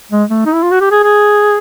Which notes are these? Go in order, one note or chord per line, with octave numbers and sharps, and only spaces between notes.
G#3
A3
D#4
E4
F4
F#4
G4
G#4
G#4